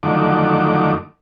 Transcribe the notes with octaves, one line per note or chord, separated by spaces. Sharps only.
F2 D3 D#3 F#3 A3 D6